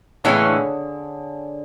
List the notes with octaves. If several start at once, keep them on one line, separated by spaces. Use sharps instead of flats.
A2 C#3 E3 G#3 C#4
D3